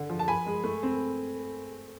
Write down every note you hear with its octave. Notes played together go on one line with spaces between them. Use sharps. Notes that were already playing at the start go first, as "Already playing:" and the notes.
Already playing: D3
F3
A5
F3 G#5 B5
G#3
A3
C4